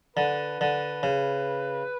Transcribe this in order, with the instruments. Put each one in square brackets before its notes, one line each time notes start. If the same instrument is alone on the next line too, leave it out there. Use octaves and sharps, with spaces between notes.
[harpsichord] D3 [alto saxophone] B4
[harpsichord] D3
C#3